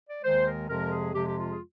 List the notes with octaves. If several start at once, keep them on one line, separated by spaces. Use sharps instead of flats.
D5
D#2 D#3 G#3 C5
A#4
F2 C3 F3 G#3 A#4
G#4
F2 C3 F3 G#3 G4
G4
F4
G#4